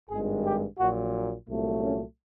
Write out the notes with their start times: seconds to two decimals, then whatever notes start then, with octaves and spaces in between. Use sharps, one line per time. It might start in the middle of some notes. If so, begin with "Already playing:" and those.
0.10 G#1 G2 D#3 G#3 G#4
0.45 G4
0.79 A#1 A#2 F#3 F#4
1.48 C2 A#2 F#3 A3
1.82 C#4